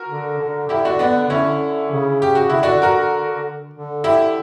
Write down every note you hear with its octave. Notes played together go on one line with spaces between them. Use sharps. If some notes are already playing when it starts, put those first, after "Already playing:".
Already playing: F#4 A#4
D3
D3
D3 E4 G4
D4 F#4
B3 D4
D3 C#4 E4
C#3
G4
F#4
D3 E4
D4 F#4
F#4 A#4
D3
E4 G4